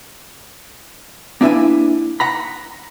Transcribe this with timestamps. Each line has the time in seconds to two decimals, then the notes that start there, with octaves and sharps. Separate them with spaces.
1.41 A#3 D4 E4 B4 E5 G#5
2.20 F#5 A#5 B5